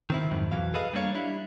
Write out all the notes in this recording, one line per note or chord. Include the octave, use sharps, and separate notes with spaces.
D#3 C4 E4
F2 G#2 D#3 F#3
B1 F2 E3 F#3 F5
G#4 A4 B4 D#5 F5
G3 A#3 D4 F4 C#5 F5
G3 D4 E4